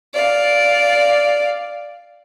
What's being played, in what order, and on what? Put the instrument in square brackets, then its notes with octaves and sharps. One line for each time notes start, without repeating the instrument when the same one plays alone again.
[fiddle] D5 F5